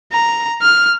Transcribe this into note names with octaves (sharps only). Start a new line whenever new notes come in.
A#5
F6